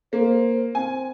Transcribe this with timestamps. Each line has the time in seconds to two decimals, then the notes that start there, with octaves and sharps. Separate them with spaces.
0.13 A#3 C5
0.75 C4 G#5